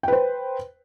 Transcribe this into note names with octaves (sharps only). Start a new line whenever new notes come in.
B4 C5 G5